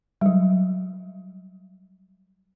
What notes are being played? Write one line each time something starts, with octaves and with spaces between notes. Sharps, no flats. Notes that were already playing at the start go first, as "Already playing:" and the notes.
F#3 G3